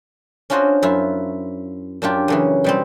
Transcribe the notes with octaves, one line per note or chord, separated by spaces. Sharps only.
C#4 D4 F4 F#4 C5 D#5
F#2 E4 F4
F#2 D4 F4 G4
F#2 C#3 E3
B2 G3 C4